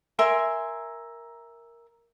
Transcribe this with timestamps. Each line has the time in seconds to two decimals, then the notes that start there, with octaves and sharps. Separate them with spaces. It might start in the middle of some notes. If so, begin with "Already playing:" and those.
0.19 A#4 E5 G#5 C6